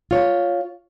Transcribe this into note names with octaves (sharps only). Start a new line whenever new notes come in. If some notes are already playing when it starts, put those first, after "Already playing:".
F4 C#5